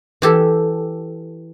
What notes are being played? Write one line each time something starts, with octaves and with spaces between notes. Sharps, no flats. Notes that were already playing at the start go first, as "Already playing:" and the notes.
E3 G4 A4